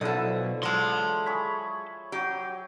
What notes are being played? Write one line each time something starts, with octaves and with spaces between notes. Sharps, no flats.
B1 D3 F3 E4 A4 D#5
F#3 G#3 A5 C6
G#4 C#5 B5
F#3 G4